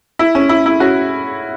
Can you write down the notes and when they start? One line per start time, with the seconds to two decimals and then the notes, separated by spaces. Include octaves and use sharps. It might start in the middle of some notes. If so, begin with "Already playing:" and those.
0.19 E4
0.35 C#4
0.49 E4
0.66 E4
0.80 C#4 F#4